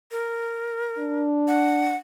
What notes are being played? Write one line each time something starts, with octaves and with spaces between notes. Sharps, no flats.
A#4
D4
F#5